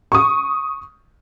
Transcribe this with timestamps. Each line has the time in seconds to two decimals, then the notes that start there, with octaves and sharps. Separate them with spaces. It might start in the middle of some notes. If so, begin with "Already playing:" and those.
0.12 C#6 D#6